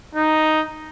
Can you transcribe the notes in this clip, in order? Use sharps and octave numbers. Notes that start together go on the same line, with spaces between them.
D#4